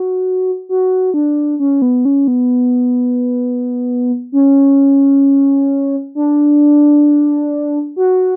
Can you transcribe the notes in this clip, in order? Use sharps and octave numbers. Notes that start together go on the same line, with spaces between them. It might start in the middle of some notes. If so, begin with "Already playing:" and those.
Already playing: F#4
F#4
D4
C#4
B3
C#4
B3
C#4
D4
F#4